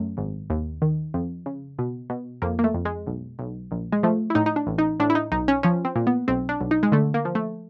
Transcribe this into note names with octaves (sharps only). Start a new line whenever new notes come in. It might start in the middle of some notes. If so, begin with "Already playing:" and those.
Already playing: F#2 A3
G#1
D#2
D#3
F2
C#3
B2
B2
F2 A#3
A#3
A3
F2
G#3
B1
B1
A#1
G#3
F3 A3
E4
A2 D#4
D#4
D4
A1
D#4
A2 D4
E4
D#4
B1 D#4
C#4
F3 C#4
C4
A#2
B3
B1 C4
D4
B1
D#4
G#3
D3 A3
A#3
F3
A3